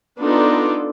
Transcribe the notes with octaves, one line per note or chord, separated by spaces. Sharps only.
B3 D4 D#4 F4 A4